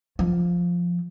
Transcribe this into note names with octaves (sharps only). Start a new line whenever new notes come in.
F3